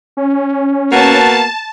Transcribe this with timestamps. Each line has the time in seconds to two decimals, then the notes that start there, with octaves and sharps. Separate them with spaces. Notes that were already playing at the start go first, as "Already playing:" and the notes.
0.17 C#4
0.91 A#3 B3 F#4 A5